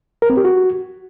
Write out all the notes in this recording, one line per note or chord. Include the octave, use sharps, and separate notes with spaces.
A#4
C4
G4
F#4